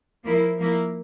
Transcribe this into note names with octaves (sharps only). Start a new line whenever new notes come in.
F3 A#3 E4
F3 A#3 E4